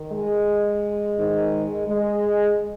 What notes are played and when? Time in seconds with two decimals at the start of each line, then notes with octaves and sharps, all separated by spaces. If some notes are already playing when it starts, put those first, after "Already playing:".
Already playing: D#3
0.11 G#3
1.17 G#2 D#3
1.88 G#3